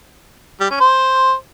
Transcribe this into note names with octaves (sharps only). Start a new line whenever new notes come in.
G3
C#4
C5